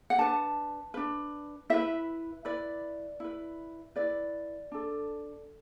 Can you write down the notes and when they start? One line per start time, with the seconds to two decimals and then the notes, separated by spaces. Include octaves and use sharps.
0.10 F#5
0.18 D4 B4 A5
0.94 D4 B4
1.70 E4 B4 E5
2.45 E4 B4 D5
3.20 E4 B4
3.96 E4 B4 D5
4.72 D4 A4